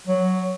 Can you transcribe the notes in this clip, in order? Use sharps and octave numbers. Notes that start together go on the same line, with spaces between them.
F#3